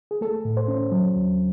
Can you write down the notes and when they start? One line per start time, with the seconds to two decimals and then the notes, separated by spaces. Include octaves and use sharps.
0.11 G#4
0.21 A3 A4
0.45 A2
0.57 C5
0.68 C#4
0.92 F#3
1.16 D#2